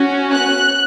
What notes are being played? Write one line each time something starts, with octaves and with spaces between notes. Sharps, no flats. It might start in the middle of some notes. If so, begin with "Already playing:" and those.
Already playing: C#4 F#4
F#6